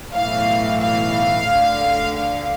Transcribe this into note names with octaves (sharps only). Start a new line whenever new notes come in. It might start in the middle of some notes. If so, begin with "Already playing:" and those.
B1 A2 E3 F5
F5
D2 D3
F5